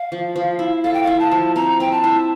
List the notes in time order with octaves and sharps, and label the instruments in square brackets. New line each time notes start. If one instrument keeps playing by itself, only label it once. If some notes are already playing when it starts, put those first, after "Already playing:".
Already playing: [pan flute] F5
[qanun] F3
F3
E4
[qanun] A4 [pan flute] F5
[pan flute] G5
[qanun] E4 [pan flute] F5
[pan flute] A5
[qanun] F3
[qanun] C4 [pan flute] A#5
[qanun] C4 [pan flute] G5
[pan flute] A5
[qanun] E4